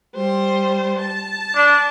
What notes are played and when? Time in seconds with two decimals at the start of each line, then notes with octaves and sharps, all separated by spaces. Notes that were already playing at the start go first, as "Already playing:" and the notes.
0.15 G3 C5
0.99 A5
1.56 D4